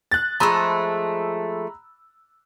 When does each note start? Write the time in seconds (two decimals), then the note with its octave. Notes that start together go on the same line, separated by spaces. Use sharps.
0.12 F#6 A6
0.40 F3 G#3 A3 A#5 B5 E6